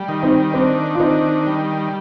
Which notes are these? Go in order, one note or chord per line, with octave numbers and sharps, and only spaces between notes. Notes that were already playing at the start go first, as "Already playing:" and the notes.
Already playing: G3
D#3
C4 D#4
C4 D4
F4
D#3 C4 D#4
G3